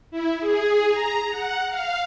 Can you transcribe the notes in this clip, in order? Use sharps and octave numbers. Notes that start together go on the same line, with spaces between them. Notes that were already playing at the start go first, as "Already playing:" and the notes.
E4
G#4
A#5
F#5
F5